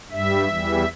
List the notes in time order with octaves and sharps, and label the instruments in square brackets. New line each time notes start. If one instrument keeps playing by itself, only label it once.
[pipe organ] G2 G3 E5
E2 E3 G3